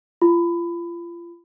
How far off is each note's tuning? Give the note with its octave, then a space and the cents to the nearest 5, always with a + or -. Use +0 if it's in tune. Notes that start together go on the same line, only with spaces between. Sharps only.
F4 -30 B5 +20